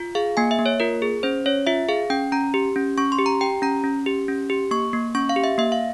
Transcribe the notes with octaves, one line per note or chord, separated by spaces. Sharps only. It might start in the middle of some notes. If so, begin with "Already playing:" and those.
Already playing: F4
G#4 F5
A#3 G#5
E5
A#3
C#5
F4 A#4
G#4
C#4 C5
C#4 C#5
F4 E5
G#4 F5
C#4 G5
C#4 A#5
G4
C#4
C#4 C#6
C6
G4
A#5
G4 G5
C#4 A#5
C#4
G4
C#4
G4
A#3 C#6
A#3
C#4 C#6
F5
G4
E5
A#3 E5
F5